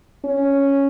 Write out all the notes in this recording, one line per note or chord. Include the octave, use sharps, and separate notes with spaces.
C#4